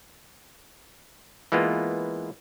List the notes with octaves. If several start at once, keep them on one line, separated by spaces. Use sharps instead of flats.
E3 G#3 A#3 B3 F4